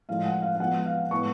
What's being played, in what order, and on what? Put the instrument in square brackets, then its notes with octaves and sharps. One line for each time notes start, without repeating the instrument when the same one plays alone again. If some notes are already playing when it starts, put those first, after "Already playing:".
[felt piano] A2 F3 G#3 F5
F#5
F5
F5
F3 G#3 B3 F#5
F5
A2 G#3 B3 C#6